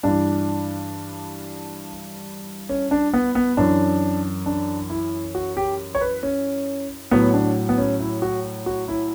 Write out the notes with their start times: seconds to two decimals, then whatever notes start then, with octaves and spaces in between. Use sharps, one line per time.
0.03 G2 E3 D4
2.69 C#4
2.91 D4
3.14 B3
3.35 B3
3.57 F#2 E3 D4
4.46 D4
4.90 E4
5.35 F#4
5.57 G4
5.95 C#5
6.01 B4
6.23 C#4
7.11 A2 F#3 B3
7.34 D4
7.69 B3
7.78 C#4
8.00 E4
8.22 F#4
8.66 F#4
8.88 E4